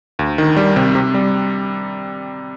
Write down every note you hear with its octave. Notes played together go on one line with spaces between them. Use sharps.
D2
D#3
G3
C3
C3
G3